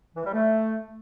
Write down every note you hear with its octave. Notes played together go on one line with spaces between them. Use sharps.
E3
G3
A3